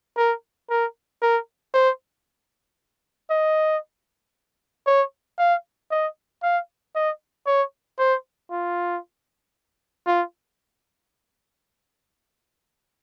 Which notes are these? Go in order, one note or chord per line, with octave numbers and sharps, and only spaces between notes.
A#4
A#4
A#4
C5
D#5
C#5
F5
D#5
F5
D#5
C#5
C5
F4
F4